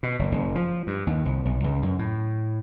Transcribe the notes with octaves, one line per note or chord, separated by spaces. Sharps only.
B2
F#1
F#1
F3
G2
D#2
C2
B1
C#2
F#2
A2